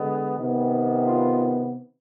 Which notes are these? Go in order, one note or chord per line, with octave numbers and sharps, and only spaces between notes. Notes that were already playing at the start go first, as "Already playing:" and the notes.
Already playing: D3 G#3 B3
C3 D#3 B3
F4